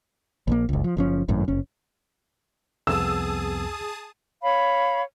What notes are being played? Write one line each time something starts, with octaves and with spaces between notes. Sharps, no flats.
A#1 C#3 A#3
F#1 C#2
F3
F#1 F3 C#4
G#1 F#2 A2
F#1 C#4
C2 F2 B3 G#4 A5 D#6 E6
C#5 F5 B5